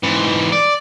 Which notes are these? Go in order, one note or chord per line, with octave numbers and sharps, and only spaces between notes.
G#2 E3
D5